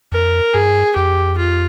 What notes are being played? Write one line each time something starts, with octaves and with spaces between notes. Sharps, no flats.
F2 A#4
G2 G#4
F2 G4
F4